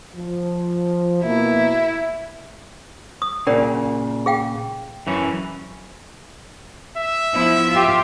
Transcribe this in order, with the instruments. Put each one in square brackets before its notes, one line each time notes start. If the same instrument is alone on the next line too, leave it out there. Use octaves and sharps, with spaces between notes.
[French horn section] F3
[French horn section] B2 A#3 [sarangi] E4
[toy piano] D#6
[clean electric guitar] A#2 C#3 [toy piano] C#4 A#4 D5
[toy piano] G#4 F5 G5
[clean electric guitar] F#2 E3 C#4
[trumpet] E5
[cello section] F3 B3 E4
F4 G4